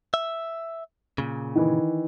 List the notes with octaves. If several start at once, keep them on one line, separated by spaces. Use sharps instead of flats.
E5
A#2 C#3
D#3 E3